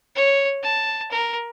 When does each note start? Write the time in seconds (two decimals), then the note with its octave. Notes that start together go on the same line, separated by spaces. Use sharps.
0.16 C#5
0.63 A5
1.11 A#4